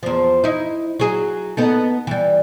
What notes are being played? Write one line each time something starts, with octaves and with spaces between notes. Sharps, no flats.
E2 F3
D#4 E4
F#3 G#4
B3 D#4 A4
E3 G3